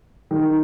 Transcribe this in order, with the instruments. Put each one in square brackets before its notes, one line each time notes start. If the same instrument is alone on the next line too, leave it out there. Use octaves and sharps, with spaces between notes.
[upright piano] D#3